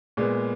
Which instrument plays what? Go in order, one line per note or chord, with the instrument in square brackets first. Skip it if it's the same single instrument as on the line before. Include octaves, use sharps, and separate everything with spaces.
[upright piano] A#2 G#3 B3